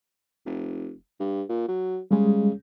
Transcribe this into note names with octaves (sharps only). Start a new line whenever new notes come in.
F1
G2
A#2
F#3
C#3 G3 G#3